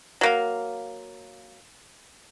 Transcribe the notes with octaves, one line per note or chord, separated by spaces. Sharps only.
F#3 A#3 F5